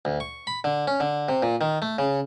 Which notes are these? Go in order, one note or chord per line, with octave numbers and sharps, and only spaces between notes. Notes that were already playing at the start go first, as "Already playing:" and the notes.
D2
C#6
B5
D3
C#4
D3
C3
A#2
D#3
A3
C#3